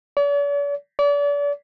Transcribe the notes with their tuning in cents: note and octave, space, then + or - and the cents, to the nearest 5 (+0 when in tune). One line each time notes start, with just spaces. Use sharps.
D5 -45
D5 -35